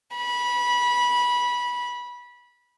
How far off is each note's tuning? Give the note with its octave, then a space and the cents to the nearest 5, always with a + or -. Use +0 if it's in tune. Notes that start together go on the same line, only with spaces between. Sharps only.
B5 -20